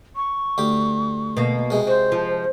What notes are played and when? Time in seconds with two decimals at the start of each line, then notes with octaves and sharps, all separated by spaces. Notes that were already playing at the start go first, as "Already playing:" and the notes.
0.16 C#6
0.58 D2 G4
1.37 B2 A#3
1.70 C3 G#3
1.87 F#4 C5
2.12 F3